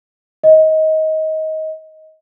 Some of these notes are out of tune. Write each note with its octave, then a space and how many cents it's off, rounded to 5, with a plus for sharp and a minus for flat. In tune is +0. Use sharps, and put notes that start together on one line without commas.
D#5 +20